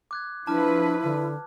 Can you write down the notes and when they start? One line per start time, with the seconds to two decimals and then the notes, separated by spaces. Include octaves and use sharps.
0.11 D6 F#6 G#6
0.47 F3 D4 E4 B4 A5 D6 F6
1.03 D3